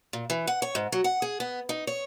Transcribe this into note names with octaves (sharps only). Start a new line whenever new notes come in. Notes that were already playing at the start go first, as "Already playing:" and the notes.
A#2
E3
F#5
C#5
G#2
F#3
F#5
G#4
B3
D#4
C#5